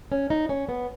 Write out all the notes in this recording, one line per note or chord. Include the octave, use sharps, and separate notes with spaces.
C#4
D#4
C#4
B3